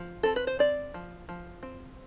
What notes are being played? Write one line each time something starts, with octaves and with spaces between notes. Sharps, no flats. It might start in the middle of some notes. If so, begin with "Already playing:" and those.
Already playing: F3
C4 A4
B4
C5
C4 D5
F3
F3
C4